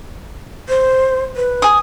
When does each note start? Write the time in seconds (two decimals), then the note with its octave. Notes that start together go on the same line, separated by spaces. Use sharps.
0.69 C5
1.36 B4
1.62 G#5 D#6